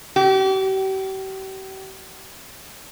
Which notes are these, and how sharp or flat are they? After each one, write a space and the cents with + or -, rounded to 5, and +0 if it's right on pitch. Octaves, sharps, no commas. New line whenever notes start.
G4 -40